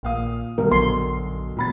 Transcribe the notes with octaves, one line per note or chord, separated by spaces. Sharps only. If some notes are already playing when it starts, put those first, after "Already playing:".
A#1 A#2 F5 D#6
B1 F#2 D3 G3 A#4
A#1 C6
E1 A#2 B5 A6